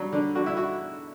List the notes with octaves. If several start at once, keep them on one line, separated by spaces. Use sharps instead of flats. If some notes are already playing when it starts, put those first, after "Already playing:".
Already playing: F#3 G3
D3
D3 F#4
E4
F#4